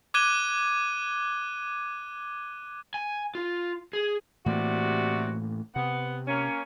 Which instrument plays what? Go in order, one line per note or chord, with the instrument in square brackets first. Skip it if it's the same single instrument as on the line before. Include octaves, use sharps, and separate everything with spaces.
[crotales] D6 F#6 G#6 D#7 G7
[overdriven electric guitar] G#5
F4
G#4
[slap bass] A2 E3 A#3 [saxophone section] C3 G3 F#4
[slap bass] C3 [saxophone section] B3 F#5
[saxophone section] A#3 C#4